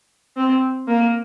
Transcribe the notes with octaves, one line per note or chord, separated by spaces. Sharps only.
C4
A#3